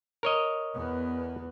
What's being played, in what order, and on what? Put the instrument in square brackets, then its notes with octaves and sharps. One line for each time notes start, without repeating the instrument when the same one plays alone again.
[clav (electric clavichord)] A#4 C#5 D#5
[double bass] E2 B3